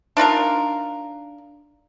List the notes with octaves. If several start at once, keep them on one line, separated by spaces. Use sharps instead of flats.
D4 D#4 F4 A#4